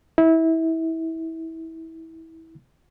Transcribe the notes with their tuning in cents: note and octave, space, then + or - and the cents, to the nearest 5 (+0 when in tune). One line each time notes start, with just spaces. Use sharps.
E4 -25